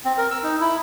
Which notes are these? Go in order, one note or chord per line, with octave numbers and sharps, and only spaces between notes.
C4
A#4
E6
D#4
E4